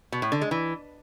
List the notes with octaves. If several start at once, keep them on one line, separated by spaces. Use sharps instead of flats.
B2
A2
D3
G#3
E3